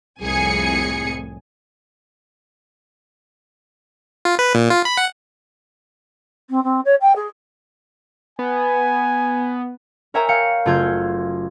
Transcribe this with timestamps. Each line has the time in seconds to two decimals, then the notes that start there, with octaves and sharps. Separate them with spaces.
0.21 C2 F2 A2 G#4 G#5 C#7
4.25 F4
4.39 B4
4.55 A#2
4.70 F4
4.85 B5
4.97 F#5
6.50 C4
6.64 C4
6.85 C#5
7.01 G5
7.16 G#4
8.39 B3 G#5
10.14 A#4 C#5 E5 G5 G#5 A#5
10.29 F5 G5 C#7
10.65 F#1 A3 F4 G6 G#6